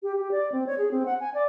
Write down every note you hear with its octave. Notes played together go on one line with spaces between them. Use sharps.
G4
G4
D5
C4
C#5
G#4
C4
F#5
G#5
D5